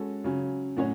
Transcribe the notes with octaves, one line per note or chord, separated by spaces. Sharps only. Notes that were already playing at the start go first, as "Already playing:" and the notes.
Already playing: G#3 C#4 F#4 A4
C#3 F#3 C#4
A2 F#3 C#4 F#4 C#5